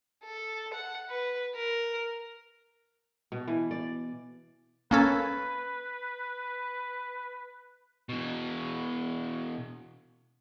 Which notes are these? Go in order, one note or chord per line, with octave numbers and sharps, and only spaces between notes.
A4
F#5
B4
A#4
B2
E3
D5
A#3 C#4 A4 B4
B2 E3